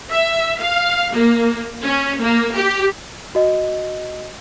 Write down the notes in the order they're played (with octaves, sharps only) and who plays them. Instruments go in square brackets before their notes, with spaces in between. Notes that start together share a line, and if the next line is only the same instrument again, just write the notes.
[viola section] E5
F5
A#3
C#4
A#3
G4
[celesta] F#4 D#5